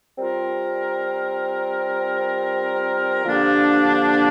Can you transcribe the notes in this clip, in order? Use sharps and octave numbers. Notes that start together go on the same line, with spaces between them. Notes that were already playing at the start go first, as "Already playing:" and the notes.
G3 C4 F4 A#4
D3 F3 A#3 D4 G4